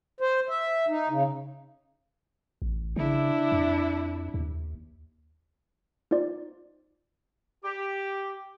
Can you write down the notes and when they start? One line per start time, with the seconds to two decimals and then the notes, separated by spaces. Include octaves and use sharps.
0.21 C5
0.49 E5
0.88 D#4
1.10 C#3
2.62 A1
2.96 C#3 D4 E4
3.52 F2
4.34 D#2
6.11 D#4 F4 C5 D5
7.64 G4